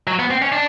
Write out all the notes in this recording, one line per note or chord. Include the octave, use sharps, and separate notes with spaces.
F#3
B3
C4
C#4
D4